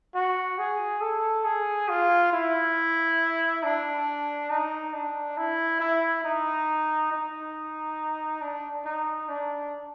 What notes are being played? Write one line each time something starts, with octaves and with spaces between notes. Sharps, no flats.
F#4
G#4
A4
G#4
F4
E4
D4
D#4
D4
E4
E4
D#4
D#4
D4
D#4
D4